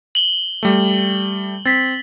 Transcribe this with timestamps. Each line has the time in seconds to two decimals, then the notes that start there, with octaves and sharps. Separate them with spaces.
0.15 F#7 G7
0.63 G3 A3
1.65 C4 A6 B6